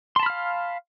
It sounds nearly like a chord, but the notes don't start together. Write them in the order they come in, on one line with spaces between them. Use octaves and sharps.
C6 A5 B5 F6 F5